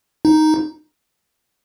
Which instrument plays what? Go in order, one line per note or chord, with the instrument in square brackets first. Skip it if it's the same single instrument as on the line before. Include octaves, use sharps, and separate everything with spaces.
[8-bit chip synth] D#4